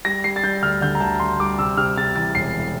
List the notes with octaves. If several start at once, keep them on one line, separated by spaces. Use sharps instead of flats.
G3 A#6
G3 C7
A6
G3 G6
D2 F6
D3 G6
A#5
D2 A5
D3 C6
G3 D6
C3 E6
C3 F6
C3 A6
E3 A6
E1 C7
E3